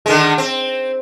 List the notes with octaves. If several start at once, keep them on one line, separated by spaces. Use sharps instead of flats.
D3 D#3 G#3
C4